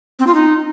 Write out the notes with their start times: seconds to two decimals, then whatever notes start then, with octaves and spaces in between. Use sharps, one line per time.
0.19 C4
0.27 F4
0.34 D#4